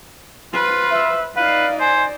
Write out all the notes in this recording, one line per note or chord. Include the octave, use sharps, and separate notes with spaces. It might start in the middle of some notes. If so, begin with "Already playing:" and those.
F4 B4 C5
E5
D#4 B4 D5 F5
C5 G#5